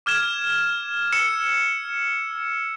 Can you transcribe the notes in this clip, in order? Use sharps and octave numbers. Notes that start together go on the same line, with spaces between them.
D6 F6 G#6 E7
E6 C#7 E7